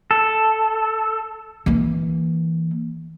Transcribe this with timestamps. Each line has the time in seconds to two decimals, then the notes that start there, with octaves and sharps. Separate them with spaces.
0.11 A4
1.66 E3 A#3